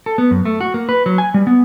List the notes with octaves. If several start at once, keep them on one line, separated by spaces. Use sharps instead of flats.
A4
B3
F#2
A3
F#4
A#3
B4
F#3
G#5
G3
B3